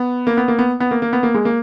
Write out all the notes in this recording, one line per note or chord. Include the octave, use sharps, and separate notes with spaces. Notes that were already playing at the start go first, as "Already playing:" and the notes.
Already playing: B3
A#3
B3
A#3
B3
B3
A#3
A#3
B3
A#3
G#3
A#3